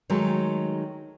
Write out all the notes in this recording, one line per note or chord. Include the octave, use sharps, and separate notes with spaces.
D#3 F#3 G#3 A3 D#4 A4